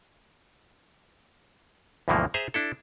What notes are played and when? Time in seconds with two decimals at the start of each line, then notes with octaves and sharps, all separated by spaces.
2.08 D2 G2 B2 E3 F3 A#3
2.34 G#4 C5 E5 A#5
2.54 D4 E4 A4